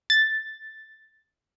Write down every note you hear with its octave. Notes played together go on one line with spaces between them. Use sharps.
A6